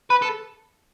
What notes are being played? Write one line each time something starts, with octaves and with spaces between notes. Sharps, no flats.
B4
A4